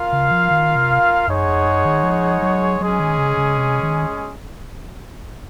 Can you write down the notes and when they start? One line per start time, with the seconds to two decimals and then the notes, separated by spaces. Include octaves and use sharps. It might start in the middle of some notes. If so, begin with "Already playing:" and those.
Already playing: F4 A#4 F5
0.13 C#3
0.31 F3
0.51 D#3
0.76 C3
1.27 F#2 G#3 D#4 G#4 C#5 F#5
1.46 F2
1.66 F#2
1.85 D#3
2.03 F3
2.42 F#3
2.80 F#3 G#3 C#4 G#4
3.00 D#3
3.18 C#3
3.37 C#3
3.57 C3
3.83 D#3